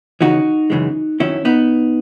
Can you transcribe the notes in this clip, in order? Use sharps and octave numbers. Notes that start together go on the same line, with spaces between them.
E2 C#3 E3 D#4 F#4
F#2 C#3 E3 G#3
F#2 D#3 F#3 C#4 E4
B3 D#4